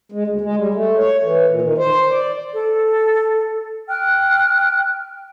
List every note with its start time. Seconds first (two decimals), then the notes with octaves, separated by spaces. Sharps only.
0.12 G#3
0.27 D2
0.41 G#3
0.57 G3
0.74 A3
0.98 C#5
1.23 E3
1.49 A#2
1.62 D#3
1.78 C5
2.10 D5
2.54 A4
3.88 G5 F6 F#6